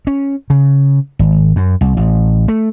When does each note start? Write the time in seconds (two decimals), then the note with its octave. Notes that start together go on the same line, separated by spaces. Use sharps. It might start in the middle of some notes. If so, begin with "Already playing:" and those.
0.07 C#4
0.50 C#3
1.19 G#1
1.56 F#2
1.81 C2
1.97 A1
2.48 A3